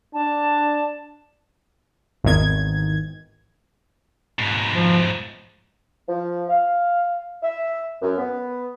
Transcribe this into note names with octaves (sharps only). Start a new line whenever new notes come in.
D4 A5
G#1 E2 D#3 G#6
G#2 B2
F3
F3
F5
E5
F#2
B3